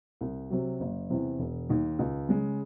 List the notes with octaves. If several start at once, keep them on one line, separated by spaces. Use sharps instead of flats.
C2
C3 F#3
F#1
E2 C3
E1
D#2 D#3
C#2
C#3 G#3